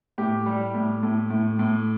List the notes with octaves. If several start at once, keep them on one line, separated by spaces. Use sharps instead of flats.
A2 G4
G3
A2
A2
A2
A2